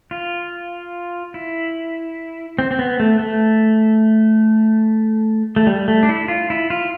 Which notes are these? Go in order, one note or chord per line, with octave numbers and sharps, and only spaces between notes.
F4
E4
C4
C4
B3
A3
A3
A3
G3
A3
D4
E4
F4
E4
F4